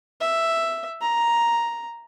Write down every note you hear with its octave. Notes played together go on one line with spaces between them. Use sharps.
E5
A#5